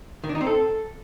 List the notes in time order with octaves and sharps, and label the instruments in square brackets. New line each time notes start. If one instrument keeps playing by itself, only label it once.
[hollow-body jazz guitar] D#3
D4
D#4
C4
A4